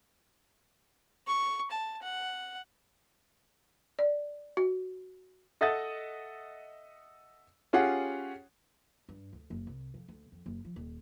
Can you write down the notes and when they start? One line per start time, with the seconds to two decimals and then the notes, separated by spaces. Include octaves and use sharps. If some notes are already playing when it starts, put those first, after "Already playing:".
1.27 C#6
1.71 A5
2.03 F#5
3.99 D5
4.57 F#4
5.61 A4 D#5 E5 F#5 D#6 A6
7.73 C#4 F4 G4 G#4 C#5 F#5
9.09 G2
9.33 D2
9.50 F#1
9.67 C2
9.94 F2
10.08 D2
10.32 F2
10.46 F#1
10.65 F3
10.76 D#1